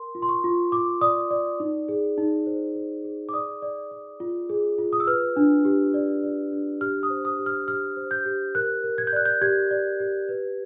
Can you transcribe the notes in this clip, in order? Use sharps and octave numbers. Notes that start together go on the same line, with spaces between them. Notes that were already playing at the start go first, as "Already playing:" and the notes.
Already playing: A#4 C6
F4
C6
C#6
F4
F4 D6
D5 D#6
D5
D#4
G#4
D#4
C5
C5
G#4
D6
D5 D#6
D5
D5
F4
G#4
F4
D#6
E6
B4 F6
D4
G4
D5
D5
D4
G4 F6
D#6
C5
D#6
G4
F6
G4 F6
C5
G6
G4
A#4 F#6
A#4
G#6
G6
D5 F#6
G6
G4 G#6
D5
G4
B4